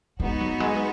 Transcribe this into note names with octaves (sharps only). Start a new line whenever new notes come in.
G#3 B3 D#4 F#4
F#3
G#3